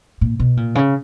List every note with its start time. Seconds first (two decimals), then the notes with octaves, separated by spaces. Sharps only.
0.21 A#2
0.40 B2
0.57 A#2
0.75 C#3